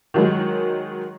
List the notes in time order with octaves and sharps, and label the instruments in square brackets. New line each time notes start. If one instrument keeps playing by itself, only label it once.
[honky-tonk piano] D#3 F#3 G#3